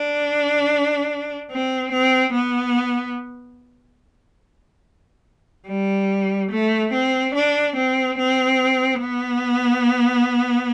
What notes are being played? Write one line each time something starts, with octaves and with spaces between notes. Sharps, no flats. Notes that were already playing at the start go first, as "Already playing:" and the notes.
Already playing: D4
C4
C4
B3
G3
A3
C4
D4
C4
C4
B3